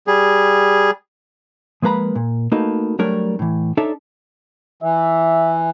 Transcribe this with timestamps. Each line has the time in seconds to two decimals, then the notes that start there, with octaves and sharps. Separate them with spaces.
0.07 G3 G#4
1.82 F3 G#3 A#3 B4 A#5 B5
2.15 A#2
2.52 A3 A#3 D#4 F#4 A4 B4
2.99 F#3 G3 A3 D4 A#4 C#5
3.39 A2 E3
3.77 D4 D#4 A4 C#5 D5 E5
4.82 E3 E5